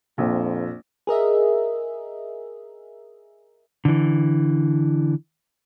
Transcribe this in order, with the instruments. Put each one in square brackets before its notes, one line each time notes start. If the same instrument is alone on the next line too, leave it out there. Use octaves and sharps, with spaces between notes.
[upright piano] A#1 [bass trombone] F2
[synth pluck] G#4 A#4 D#5 E5
[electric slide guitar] D3 E3